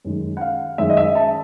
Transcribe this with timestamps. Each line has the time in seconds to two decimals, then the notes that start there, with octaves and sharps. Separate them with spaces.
0.05 F#2 D#3 G#3
0.37 F#5
0.41 F5
0.78 F#2 D#3 G#3 E5
0.90 D#5
0.97 E5
1.15 A5